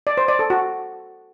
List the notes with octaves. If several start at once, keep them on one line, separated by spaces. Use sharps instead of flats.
D5
C5
D5
A4
F#4